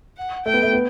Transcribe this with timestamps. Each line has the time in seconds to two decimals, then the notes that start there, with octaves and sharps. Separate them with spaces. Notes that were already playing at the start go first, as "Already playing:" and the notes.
0.17 F#5
0.46 A3 G5
0.54 B3
0.63 A3
0.73 B3